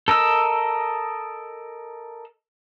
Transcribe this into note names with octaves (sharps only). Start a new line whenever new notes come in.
A4 A#4 D#5 E6